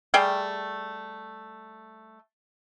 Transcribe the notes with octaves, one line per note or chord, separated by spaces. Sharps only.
G3 A3 G#4 G5